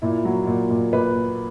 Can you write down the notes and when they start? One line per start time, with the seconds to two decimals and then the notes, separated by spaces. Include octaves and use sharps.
0.02 A#2 E4
0.25 F#3
0.47 A#2
0.70 A#2
0.93 A#2 B4